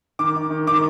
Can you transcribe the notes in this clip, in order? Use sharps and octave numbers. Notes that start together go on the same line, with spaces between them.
D#3 D6
D#3
D#3
D#3 D6